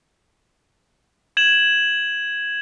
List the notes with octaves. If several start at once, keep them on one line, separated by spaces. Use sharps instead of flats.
G#6 E7 F#7